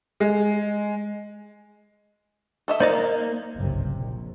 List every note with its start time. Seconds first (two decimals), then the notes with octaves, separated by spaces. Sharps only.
0.20 G#3
2.68 A4 D#5 E5
2.80 A#3 D#4 C5 D5 D#5
3.57 F#1 C2 G2 C3
3.91 A#1